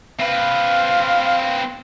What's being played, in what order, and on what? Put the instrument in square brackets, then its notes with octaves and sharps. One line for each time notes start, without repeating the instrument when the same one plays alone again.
[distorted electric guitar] C4 B4 [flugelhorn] F5